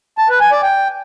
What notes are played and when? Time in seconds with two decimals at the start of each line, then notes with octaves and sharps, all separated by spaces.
0.18 A5
0.29 B4
0.41 G#5
0.52 D5
0.63 G5